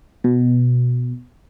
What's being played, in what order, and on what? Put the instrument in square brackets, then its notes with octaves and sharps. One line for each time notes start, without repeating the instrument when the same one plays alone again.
[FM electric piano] B2